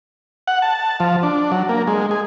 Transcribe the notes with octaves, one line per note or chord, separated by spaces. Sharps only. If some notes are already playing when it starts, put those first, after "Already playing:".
F#5
A5
F3
D4
F#3
A#3
G#3
G#4